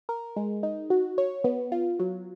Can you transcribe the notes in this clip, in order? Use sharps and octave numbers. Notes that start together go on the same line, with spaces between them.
A#4
G#3
D#4
F#4
C#5
B3
F4
F#3